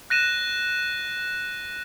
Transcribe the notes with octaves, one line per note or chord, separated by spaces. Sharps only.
F#6 A#6 D#7 E7